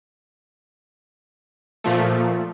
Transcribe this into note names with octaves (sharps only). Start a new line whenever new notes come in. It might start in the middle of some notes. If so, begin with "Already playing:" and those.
A#2 F3 A3